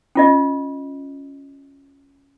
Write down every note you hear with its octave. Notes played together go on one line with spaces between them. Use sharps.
C#4 F4 D#5